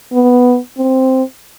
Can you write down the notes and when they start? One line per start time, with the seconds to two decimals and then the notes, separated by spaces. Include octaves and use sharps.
0.13 B3
0.78 C4